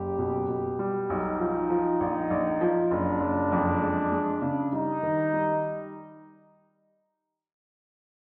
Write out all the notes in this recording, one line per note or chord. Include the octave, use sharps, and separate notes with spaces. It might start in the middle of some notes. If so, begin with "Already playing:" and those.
Already playing: F#1 G4
B2
B2
G3
B1 D#4
F3
F3
A#1
A#1
F3
F#1 D4
F#1
F2
G#3
G#3
C#3
G3 D#4
D#3
G3